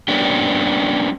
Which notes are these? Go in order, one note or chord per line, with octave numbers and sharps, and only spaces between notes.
G3 A#3 B3 C#4 D4 G4